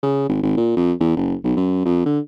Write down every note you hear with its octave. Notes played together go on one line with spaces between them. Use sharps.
C#3
G#1
G#1
A#2
F2
E2
F#1
B1
F#2
F2
D3